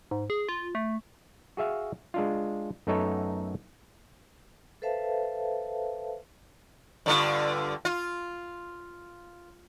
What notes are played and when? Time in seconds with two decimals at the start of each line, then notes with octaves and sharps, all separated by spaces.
0.11 G#2
0.30 G#4
0.49 F4
0.75 A3
1.57 F#4 G#4 E5 F5
2.14 G#3 D4 F4
2.87 F#2 A3 B3 D#4 A4 C#5
4.82 A4 B4 C5 E5 F5 A5
7.06 G2 D3 F4
7.85 F4